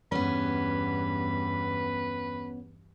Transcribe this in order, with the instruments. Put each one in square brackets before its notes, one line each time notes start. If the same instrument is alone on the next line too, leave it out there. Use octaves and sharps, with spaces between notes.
[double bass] E2 G2 [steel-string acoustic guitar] B3 C#4 [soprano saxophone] B4